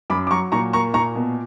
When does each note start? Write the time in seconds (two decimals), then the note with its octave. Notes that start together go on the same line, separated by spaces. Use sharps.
0.10 F#2 B5 D6
0.27 D6
0.31 F#3 A#5 C#6
0.52 A#2 A#5 C#6
0.73 A#3 A#5 C#6
0.94 A#2 A#5 C#6
1.16 B2